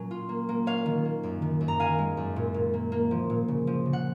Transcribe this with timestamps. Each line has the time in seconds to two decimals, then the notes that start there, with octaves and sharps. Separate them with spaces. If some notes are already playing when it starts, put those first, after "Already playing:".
Already playing: A#2 F#3 C#4 G#5
0.11 F4
0.29 A#3
0.49 A#3
0.66 C#4 C#5 F5
0.86 D#3
1.05 A#3
1.23 F#2
1.42 D#3
1.61 F#2
1.68 A#5
1.79 D#3 F5 G#5
1.98 G#3
2.17 F#2
2.36 A#2
2.54 A#2
2.74 A#3
2.92 A#3
3.11 F3
3.30 A#2
3.48 C#3
3.67 F3
3.86 C#3
3.93 F#5